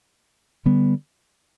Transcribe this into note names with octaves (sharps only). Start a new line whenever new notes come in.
D3 G3 B3